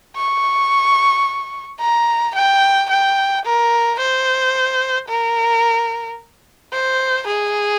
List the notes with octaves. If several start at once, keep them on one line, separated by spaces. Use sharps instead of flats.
C#6
A#5
G5
G5
A#4
C5
A#4
C5
G#4